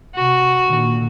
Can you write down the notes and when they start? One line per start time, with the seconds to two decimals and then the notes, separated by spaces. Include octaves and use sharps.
0.15 C3 F#4
0.66 A#2 D3 D#3